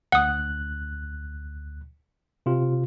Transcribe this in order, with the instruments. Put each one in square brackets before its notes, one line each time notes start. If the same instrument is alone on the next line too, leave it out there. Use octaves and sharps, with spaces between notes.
[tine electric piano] D2 F#6 [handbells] F#5 D#6
[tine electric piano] C3 F4